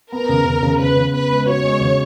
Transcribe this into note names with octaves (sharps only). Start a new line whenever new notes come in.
B3 A#4
C#3
C#3
C#3
C#3 B4
C#3
B3 B4
G#3
F#4 C#5
G#3
C#3